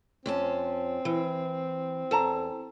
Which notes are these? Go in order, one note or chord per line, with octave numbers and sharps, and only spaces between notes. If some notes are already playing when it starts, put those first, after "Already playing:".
F2 C4 C#4 A5
E3
E2 A4 A5 A#5